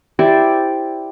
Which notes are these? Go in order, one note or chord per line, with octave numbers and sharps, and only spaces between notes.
E4 G4 C5 D5